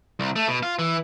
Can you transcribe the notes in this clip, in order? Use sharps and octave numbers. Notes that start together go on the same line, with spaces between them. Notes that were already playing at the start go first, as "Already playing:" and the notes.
C2
A3
B2
F4
E3